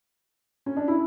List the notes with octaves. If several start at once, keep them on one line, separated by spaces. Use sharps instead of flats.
C#4
D4
E4